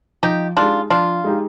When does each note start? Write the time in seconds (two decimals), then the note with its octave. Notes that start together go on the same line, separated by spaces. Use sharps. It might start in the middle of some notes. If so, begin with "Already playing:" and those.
0.23 F3 D#4 G4
0.57 G#3 D4 D#4 F4 G4
0.90 F3 D4 F4
1.24 G#3 D#4 G4